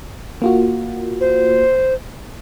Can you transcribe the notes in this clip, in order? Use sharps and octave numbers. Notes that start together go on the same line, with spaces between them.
A#3 F4 F#4
C5